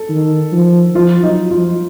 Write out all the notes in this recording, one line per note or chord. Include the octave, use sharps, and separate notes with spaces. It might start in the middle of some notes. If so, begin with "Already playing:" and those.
Already playing: A4
D#3
F3
F3 F4
F#3 D#4
F3 F4